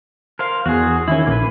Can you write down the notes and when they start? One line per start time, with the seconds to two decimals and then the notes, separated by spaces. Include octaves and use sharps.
0.39 A#4 C5 F5
0.66 E2 F#4 G#4
1.08 D#3 C#4 E4
1.27 A#1 A#3 B4